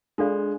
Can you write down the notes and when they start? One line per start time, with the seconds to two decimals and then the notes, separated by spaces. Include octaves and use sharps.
0.18 G#3 D4 F4 A4 D5 F5